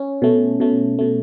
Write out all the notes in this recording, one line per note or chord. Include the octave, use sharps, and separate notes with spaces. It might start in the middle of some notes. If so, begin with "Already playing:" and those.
Already playing: C#4
B2 A3
B2 A3
B2 A3